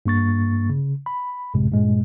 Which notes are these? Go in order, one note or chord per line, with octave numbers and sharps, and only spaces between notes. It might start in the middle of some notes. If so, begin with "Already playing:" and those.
G2 A#3 C#6 A6
C#3
B5
A1 F#2 A2 C3 G#3
G2 A#2 G#3